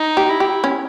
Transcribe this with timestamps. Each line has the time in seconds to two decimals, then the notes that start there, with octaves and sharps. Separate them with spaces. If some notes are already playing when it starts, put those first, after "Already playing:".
Already playing: D#4
0.17 G4
0.29 E4
0.40 G4
0.64 C#4